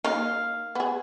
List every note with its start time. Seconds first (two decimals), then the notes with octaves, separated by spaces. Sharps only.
0.04 A#3 D#4 F5
0.75 B3 G#4